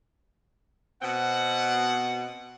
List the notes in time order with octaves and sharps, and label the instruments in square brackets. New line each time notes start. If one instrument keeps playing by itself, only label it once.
[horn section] B2 C4 F#5